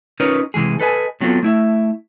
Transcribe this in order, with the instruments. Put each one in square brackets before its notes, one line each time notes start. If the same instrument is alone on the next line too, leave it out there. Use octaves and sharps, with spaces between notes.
[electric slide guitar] C#4 D#4 F4 A#4 B4 C#5
C3 E3 G#3 G#4
A4 B4 D#5 G#5
A2 F#3 B3 C4 F4 A4
A3 E4 E5